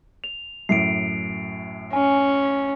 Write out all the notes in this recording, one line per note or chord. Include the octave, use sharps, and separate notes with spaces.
F7
F#2 A2 C7 D7
C#4 G#5